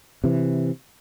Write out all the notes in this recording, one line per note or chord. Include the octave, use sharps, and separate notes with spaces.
C3 E3